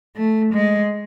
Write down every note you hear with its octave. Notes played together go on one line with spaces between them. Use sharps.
A3
G#3